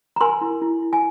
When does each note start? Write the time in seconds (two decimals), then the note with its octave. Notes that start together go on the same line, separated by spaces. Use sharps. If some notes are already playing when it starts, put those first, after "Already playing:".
0.16 A#5
0.21 A#4 G#5 C6
0.41 E4
0.62 E4
0.82 E4
0.93 G#5